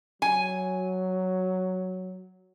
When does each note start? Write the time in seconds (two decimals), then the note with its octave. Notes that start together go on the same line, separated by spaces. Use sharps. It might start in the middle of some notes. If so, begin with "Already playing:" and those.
0.22 F#3 G#5